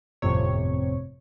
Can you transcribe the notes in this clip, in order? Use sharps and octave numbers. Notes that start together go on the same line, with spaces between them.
G1 F2 A2 C3 C#5